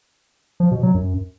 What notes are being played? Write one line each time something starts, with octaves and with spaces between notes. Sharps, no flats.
F3
B2
F#3
F#2